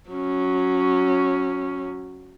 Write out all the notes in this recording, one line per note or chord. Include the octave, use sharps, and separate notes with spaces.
F#3 C#4